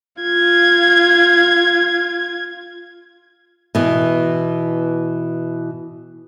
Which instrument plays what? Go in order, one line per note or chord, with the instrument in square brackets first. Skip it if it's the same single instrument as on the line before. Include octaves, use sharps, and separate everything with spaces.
[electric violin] F4 G#6
[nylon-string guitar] B2 E3